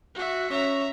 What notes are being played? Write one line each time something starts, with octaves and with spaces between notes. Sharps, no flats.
F#4 E5
C#4 C#5 E5 A#5 C#6